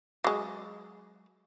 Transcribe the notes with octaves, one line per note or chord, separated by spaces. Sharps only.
F#3 G#3